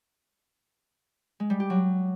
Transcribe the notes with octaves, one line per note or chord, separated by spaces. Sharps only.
G#3
G3
G4
F#3